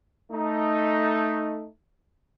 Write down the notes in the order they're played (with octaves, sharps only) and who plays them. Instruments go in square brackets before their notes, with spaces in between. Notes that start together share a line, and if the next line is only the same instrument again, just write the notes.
[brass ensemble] A3 D#4